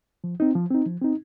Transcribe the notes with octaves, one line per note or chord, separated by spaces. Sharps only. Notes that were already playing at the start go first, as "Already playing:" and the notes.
F3
C4 D#4
F3
C4 D#4
F3
C4 D#4